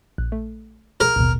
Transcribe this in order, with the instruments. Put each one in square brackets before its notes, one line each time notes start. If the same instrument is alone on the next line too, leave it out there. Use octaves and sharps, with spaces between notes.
[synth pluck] A#1 F#6
A3
[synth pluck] G#4 [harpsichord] A#4
[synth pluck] A1 D#2 B2